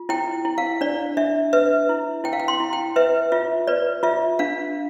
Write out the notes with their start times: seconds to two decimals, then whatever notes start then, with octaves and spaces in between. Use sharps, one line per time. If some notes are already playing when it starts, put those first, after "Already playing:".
Already playing: F4
0.09 E4 G5
0.45 E4
0.58 F5
0.81 D4 D5
1.17 D4 E5
1.53 B4 E5
1.89 E4
2.24 E4 G5
2.33 F5
2.40 G5
2.48 C6
2.60 E4
2.73 G5
2.96 B4 E5
3.32 F4 E5
3.67 B4 D5
4.03 F4 E5
4.39 D4 F5